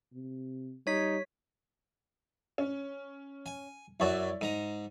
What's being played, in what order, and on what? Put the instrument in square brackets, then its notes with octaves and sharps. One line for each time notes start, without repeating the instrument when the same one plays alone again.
[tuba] C3
[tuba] G3 [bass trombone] D#4 [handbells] C#5 B6
[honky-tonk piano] C#4
[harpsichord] G#5
[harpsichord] F#2 F#4 [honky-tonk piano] E4 C#5 D5
[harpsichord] G#2 A#5 [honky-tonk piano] D#7